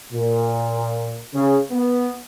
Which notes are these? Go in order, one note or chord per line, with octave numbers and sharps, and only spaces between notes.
A#2
C#3
B3